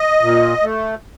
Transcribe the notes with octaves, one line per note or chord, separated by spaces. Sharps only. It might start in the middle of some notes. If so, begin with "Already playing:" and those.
Already playing: D#5
A#2
A3